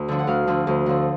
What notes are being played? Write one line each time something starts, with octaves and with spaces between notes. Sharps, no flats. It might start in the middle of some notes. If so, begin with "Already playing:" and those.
Already playing: D2
D3 F3
F#5
D2 F5
D3 F3
D2
D3 F3